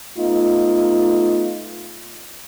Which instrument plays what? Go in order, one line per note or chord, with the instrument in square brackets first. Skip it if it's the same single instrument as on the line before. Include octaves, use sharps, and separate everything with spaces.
[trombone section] A3 B3 D#4 F4